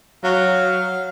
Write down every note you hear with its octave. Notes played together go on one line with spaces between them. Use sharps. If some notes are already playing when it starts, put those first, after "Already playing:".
F#3 F5